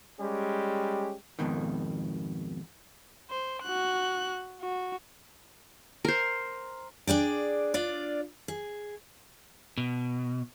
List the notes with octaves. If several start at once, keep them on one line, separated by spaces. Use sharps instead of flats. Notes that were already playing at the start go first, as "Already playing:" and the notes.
G3 G#3 C#4 G4
F2 G#2 B2 D#3
C5
F#4 F#6
F#4
A#4 C5
D4 G#4 D5 G5
D4 F4 D5
G#4
B2